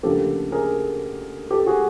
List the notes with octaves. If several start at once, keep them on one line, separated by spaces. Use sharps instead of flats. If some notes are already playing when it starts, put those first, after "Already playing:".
D2 C#3 F3 A#3 G4 A4
G#4 A#4
G4 A4
F#4 G#4